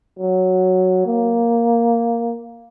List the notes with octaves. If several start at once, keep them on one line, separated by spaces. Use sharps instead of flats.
F#3
A#3